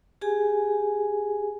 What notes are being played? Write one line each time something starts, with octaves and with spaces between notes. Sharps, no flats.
G4 G#4 G#5